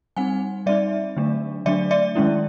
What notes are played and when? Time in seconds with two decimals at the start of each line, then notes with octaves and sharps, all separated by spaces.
0.16 G3 C4 D#4 F#5 G#5
0.66 G3 C4 D#4 D5 E5
1.16 D3 F#3 A3 D4
1.66 D3 F#3 A3 D4 D5 E5
1.91 D5 E5
2.15 D#3 G#3 C#4 E4